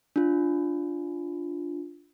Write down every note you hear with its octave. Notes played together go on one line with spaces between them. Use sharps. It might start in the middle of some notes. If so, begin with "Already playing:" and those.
D4 F4